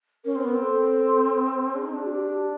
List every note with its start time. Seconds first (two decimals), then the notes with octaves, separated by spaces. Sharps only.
0.25 C#4 A#4
0.35 C4
0.44 B3
0.54 C4
0.62 A4
1.75 D4 G#4
1.84 D#4
1.94 D4
2.05 F#4
2.13 G4